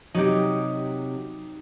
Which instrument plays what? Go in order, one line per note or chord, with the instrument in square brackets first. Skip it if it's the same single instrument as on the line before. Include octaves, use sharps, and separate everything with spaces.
[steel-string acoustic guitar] C3 F#3 [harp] D#4 G4